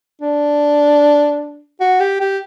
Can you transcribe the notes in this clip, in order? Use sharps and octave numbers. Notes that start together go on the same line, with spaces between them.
D4
F#4
G4
G4